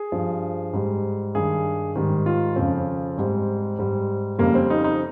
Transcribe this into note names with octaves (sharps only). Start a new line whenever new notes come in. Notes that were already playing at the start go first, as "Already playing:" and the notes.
Already playing: G#4
G2 F3
G#2 G3
G2 D#3 G3 G#4
G#2 D#3 G3
F4
F2 C#3 F3 C4
G#2 G3
G#2 G3
F2 C#3 G3 A#3
C4
D#4
D#4